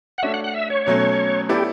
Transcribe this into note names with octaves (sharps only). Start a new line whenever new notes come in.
F#5
A3 D4 F#4 C#5 E5
F#5
F#5
E5
C#5
B2 F#3 A3 C#4
B3 E4 G4 A4 D5